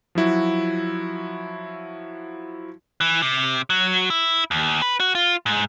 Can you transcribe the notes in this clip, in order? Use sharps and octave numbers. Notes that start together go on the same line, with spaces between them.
F3 F#3 E4 F#4
E3
C3
F#3
E4
D#2
B4
F#4
F4
G#2